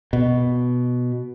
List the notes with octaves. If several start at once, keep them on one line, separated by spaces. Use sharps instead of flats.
B2